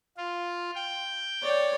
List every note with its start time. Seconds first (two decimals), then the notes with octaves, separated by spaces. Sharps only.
0.17 F4
0.75 G5
1.43 C#5 D5